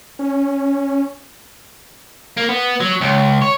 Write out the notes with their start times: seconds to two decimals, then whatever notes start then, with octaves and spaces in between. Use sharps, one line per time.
0.19 C#4
2.37 A#3
2.49 B3
2.80 F#3
3.01 C#2
3.42 C#5